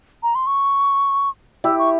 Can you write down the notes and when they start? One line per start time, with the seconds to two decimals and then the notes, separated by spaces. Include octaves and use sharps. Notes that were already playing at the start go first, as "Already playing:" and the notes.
0.23 A#5
0.35 C6
0.47 C#6
1.64 E4 G4 E6
1.79 C#6